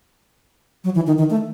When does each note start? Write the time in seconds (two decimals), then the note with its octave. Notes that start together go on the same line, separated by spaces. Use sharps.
0.84 F#3
0.95 E3
1.07 D#3
1.18 D#3
1.30 A3